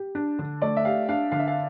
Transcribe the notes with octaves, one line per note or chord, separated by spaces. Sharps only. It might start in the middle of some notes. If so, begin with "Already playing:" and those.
Already playing: G4
D4
D3
A3 D5
E5
G4 F5
D4 F5
D3 F5
E5
F5